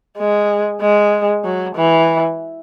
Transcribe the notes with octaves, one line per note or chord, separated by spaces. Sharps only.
G#3
G#3
F#3
E3